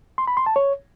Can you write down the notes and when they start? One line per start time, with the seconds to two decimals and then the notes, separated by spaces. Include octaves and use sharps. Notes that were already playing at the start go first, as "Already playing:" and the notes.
0.18 C6
0.27 B5
0.37 C6
0.46 A5
0.56 C#5